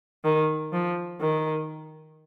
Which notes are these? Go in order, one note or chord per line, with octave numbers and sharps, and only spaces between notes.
D#3
F3
D#3